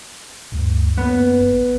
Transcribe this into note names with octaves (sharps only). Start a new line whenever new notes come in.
D2 G2
F#2 A#3 B3
A1